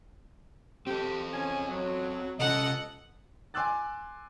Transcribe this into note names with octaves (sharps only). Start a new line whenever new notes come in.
C4 G4 A4
C#3 C#4 G#5
F#3
C3 C#4 F4 A4 D#5 F#5
G#5 C6 D6 E6 F#6 A6